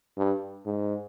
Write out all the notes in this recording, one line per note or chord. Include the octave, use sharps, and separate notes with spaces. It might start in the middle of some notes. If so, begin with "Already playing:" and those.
G2
G#2